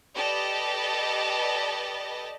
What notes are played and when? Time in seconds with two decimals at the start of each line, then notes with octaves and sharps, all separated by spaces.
0.15 G4 A4 B4 D5 D#5 A5